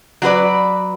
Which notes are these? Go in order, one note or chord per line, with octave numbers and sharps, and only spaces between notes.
F#3 F#4 B4 D5